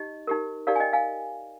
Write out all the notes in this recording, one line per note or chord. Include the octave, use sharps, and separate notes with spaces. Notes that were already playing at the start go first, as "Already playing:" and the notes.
Already playing: D#4 G4 D#5
D#4 G4 A#4
D#4 G4 A#4 D5 F5
G#5
D#5 G5
F5 G#5